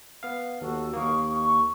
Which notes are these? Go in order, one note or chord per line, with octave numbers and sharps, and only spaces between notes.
B3 F5
D#2 F#4 A4
D#2 A#3 D#5 F5 C#6
C#6